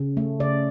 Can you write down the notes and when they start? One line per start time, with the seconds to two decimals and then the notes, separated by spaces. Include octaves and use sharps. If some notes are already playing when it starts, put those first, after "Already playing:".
Already playing: C#3
0.17 A3
0.40 C#3 D5